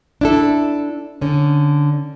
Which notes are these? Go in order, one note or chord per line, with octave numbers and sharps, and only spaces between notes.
D4 E4 A4
D3 C#4